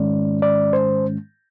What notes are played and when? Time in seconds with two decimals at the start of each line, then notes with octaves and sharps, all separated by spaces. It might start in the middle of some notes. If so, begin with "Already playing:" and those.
Already playing: G#2 D#3 G#3 C#4 D5
0.42 D5
0.73 C5